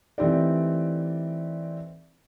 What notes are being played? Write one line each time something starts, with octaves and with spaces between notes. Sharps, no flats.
E3 A3 C4 D#4 G4 D5